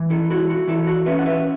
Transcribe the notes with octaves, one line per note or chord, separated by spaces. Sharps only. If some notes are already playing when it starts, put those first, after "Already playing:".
Already playing: E3
E4 A4
E4 F#4
F#4
E3 E4 A4
F#4
C#4 B4 E5
F#5
B4 E5